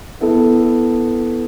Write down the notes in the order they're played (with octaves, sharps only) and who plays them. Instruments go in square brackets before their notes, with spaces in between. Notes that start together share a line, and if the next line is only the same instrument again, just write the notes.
[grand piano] B3 E4 A4